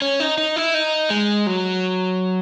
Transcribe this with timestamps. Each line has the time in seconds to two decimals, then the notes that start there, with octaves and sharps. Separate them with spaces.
0.02 C#4
0.20 D#4
0.38 D#4
0.56 E4
0.74 D#4
1.10 G#3
1.47 F#3